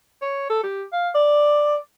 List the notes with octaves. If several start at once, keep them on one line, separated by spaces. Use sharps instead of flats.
C#5
A4
G4
F5
D5